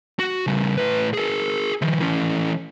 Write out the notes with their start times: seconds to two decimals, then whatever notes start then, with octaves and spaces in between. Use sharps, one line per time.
0.19 F#4
0.47 C#3 G3
0.78 A2 B4
1.13 G#4 A#4
1.82 D#3 F3
2.01 E3 C#4